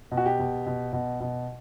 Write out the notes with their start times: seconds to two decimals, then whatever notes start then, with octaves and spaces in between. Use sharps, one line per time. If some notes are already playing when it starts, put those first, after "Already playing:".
0.12 B2
0.17 F#4
0.26 G4
0.39 B2
0.66 B2
0.93 B2
1.20 B2